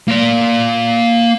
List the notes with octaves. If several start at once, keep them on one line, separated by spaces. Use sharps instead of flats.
A#3 C6